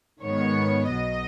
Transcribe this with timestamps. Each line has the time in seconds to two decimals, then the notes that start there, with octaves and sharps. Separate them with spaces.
0.22 G#2 D#3 G#3 B3 C#5
0.90 B1 B2 F#3 D#5